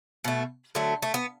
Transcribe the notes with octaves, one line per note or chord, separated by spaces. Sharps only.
B2 A3
D3 F#3 A3
A3
B3